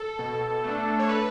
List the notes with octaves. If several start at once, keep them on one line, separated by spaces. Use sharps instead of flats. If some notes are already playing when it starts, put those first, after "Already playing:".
Already playing: A4
B2
A3 D4
C#5
B4